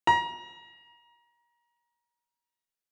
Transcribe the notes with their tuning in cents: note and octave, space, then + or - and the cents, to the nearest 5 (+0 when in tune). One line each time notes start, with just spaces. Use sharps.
A#5 +30